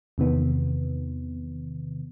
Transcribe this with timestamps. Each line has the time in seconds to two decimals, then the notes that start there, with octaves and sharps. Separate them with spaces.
0.18 E2 C3 D#3 B3